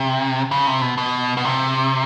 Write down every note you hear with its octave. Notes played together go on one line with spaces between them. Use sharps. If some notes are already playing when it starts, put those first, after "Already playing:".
Already playing: C3
C#3
C3
B2
B2
B2
C3